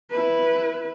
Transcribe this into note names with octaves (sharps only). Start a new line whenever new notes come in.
E4 B4